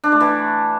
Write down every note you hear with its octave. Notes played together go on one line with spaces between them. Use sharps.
D4
A3
E3